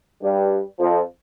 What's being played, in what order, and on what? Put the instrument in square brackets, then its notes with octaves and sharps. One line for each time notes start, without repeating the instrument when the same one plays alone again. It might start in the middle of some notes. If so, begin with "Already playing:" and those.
[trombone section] G2 G3
F2 F3